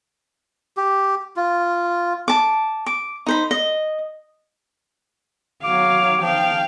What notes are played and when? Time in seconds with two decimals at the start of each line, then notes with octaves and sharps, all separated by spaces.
0.77 G4
1.36 F4
2.28 A5 D6
2.86 D6
3.27 D#4 C5 B5
3.51 D#5
5.64 F#3 F5 D6
6.22 F3 F5 G5